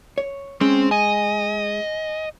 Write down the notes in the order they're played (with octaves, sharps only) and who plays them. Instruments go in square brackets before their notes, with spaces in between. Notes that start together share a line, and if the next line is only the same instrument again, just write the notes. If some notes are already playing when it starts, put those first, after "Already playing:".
[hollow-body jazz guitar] C#5
[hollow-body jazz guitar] G#3 [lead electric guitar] C4 [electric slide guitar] C#4
[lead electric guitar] D#5 [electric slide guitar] G#5